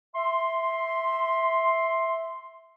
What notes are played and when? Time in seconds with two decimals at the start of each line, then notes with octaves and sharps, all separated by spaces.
0.15 E5 C6